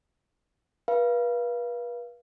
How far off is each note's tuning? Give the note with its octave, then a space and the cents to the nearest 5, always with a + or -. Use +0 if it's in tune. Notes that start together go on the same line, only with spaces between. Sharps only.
B4 -35 F5 -20